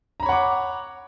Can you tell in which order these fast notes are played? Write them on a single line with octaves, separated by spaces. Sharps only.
A#5 B5 C#5 F#5 D6